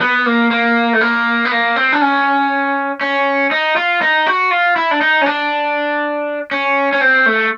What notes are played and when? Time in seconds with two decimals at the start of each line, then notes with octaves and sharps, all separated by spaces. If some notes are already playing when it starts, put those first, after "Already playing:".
0.01 B3
0.26 A#3
0.51 A#3
0.93 A3
1.01 A#3
1.45 B3
1.51 A#3
1.76 C4
1.93 D4
2.01 C#4
3.01 C#4
3.51 D#4
3.76 F4
4.01 D#4
4.26 F#4
4.51 F4
4.76 E4
4.91 D4
5.01 D#4
5.21 C#4
5.26 D4
6.51 C#4
6.93 C#4
7.01 C4
7.26 A3